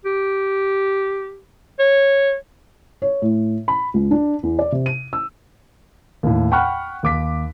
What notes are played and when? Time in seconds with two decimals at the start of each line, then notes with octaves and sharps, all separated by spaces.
0.05 G4
1.79 C#5
3.02 C#5
3.22 A2
3.68 B5
3.94 C#2
4.11 D4
4.43 E2
4.59 D5
4.72 C3
4.86 D#7
5.13 E6
6.23 D#2 A2
6.51 F#5 G5 B5 C#6 F6 F#6
7.03 D#2 D6 B6